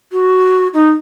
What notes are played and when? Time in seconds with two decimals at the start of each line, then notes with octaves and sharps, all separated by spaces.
0.12 F#4
0.74 D#4